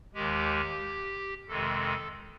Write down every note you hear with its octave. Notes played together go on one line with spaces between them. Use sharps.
D#2 D#3 G#3 G4
F2 C3 D#3 G#3 A4